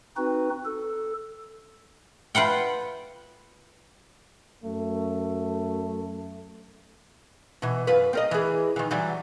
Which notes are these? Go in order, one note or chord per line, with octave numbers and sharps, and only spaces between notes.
C4 D#4 F#4 B4
A4
F4 B4 F#5 G5
F#2 A3
B2 E3
F#2 F4 B4
C4 A#4 D#5
E3 G#4
D#3 E3
E3 F#3 G3